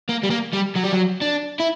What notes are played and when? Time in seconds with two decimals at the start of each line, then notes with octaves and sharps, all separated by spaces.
0.09 A#3
0.23 G3
0.30 A#3
0.53 G3
0.75 F#3
0.83 G3
0.92 F#3
1.21 D4
1.60 E4